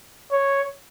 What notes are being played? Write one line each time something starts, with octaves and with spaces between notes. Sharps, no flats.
C#5